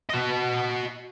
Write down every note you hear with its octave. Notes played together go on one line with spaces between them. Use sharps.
F#4 D#5